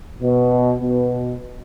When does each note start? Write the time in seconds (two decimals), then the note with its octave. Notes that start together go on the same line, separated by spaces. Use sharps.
0.22 B2
0.80 B2